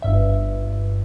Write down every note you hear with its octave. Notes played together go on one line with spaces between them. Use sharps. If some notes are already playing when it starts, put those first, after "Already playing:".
G1 G2 E5